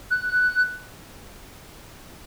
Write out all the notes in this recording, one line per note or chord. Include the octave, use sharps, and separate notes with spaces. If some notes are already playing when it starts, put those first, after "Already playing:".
F#6